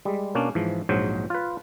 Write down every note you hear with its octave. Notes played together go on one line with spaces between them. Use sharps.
G3 G#3
B2 A#3 C#4 D4
G#2 E3 F3
A#1 G#2 F#3 C5
F4 B4